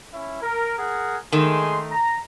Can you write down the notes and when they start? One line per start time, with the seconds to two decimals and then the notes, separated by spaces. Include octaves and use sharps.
0.13 C#4 E4
0.42 A#4
0.77 G#4 A#4 F#5
1.32 D#3 G#3 A3 G#4 C6
1.91 A#5